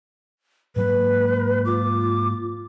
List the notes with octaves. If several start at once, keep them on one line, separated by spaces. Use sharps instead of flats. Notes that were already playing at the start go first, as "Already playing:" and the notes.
G#2 F#3 A#3 B4
F4 D6